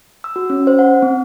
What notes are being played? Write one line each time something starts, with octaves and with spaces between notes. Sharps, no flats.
E6
F#4
C#4
C5
F#5
C4